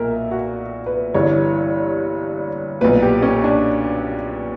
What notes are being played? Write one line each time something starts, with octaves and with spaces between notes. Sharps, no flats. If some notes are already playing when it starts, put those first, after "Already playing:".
Already playing: B1 A#2 A#4 E5
F#4
B4
G1 G2 E3 C#5
B1 A#2 B4
G4
C#4
D4